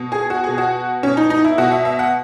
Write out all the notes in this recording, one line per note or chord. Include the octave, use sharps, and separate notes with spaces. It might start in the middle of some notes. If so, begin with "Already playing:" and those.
Already playing: B2
G#4
F#4
B2 G#4
F#4
B2 C#4
D#4
D#4
E4
B2 F#4
E5
E5
F#5